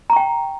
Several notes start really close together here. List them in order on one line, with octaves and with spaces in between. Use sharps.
A#5 C#6 G5